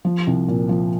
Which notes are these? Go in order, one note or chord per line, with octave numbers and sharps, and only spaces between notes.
F3
C2
A#2
F3